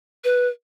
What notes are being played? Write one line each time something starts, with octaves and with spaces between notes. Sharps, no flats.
B4